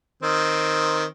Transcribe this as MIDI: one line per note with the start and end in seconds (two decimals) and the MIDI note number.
0.23 1.05 51
0.23 1.05 60